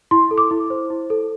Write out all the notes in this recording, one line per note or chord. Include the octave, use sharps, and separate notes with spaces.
E4 C6
A4
D6
E4
C5
E4
A4